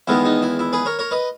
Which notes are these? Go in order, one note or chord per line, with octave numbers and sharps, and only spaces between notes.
E2 D#3 G#3 B3 E4
D#4
E4
E4
G#4 B4
A#4 C#5
A#4 C#5
B4 D#5